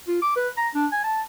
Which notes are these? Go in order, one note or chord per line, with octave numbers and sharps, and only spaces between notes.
F4
D6
B4
A#5
D4
G#5
A5